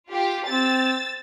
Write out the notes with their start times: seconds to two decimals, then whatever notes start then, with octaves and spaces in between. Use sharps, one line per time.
0.10 F4 G4
0.48 C4 E6 A6